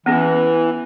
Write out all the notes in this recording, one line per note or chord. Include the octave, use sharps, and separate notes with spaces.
E3 B3 C#4 G#4